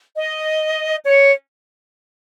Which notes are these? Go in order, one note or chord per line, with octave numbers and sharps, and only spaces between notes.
D#5
C#5